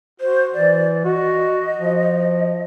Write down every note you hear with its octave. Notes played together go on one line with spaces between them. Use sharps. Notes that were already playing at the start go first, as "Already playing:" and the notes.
F#4 C5
E3 D5
F#4 D#5
F3